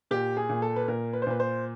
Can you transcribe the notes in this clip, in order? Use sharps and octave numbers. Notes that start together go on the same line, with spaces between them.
A#2 G4
G#4
A#2
A4
B4
A#2 A#4
B4
C5
A#2 B4
C5